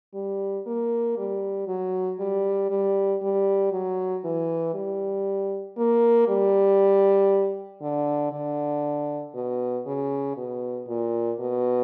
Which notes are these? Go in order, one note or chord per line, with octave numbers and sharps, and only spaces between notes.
G3
A#3
G3
F#3
G3
G3
G3
F#3
E3
G3
A#3
G3
D3
D3
B2
C#3
B2
A#2
B2